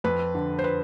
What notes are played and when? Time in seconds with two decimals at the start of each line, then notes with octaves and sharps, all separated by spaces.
0.04 F2 B4
0.34 D3
0.59 C5
0.64 B4